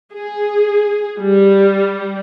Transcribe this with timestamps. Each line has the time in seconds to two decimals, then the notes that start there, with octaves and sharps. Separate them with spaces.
0.13 G#4
1.19 G3